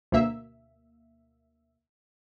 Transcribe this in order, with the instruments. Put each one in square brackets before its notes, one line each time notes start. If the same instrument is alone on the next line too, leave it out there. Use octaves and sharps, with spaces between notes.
[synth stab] D2 B2 A#3 E5